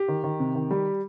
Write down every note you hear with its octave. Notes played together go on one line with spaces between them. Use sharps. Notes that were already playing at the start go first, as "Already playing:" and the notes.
Already playing: G4
D#3
D#3
C3
D#3
G3